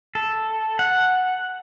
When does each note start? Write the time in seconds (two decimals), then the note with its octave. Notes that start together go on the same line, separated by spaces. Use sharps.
0.15 A4
0.79 F#5